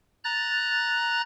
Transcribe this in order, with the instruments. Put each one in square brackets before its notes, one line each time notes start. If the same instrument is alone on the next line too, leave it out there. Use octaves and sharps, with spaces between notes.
[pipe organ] A#5 F#6 A6